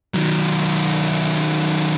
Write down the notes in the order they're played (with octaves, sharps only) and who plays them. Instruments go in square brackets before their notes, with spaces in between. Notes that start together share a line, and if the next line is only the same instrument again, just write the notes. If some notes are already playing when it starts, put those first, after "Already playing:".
[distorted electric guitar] D#3 F#3